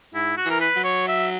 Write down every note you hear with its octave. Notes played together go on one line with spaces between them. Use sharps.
G#2 E4
F#4
E3 A#4
B4
F#3
C#5
E5